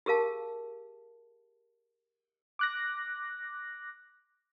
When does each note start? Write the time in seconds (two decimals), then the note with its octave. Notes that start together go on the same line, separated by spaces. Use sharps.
0.06 G4 G#4 A#4 F5 A5
2.59 D6 F#6 A#6